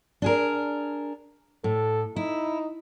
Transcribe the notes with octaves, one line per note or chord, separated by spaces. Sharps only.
D4 G#4 A#4
A2 A4
D#4 E4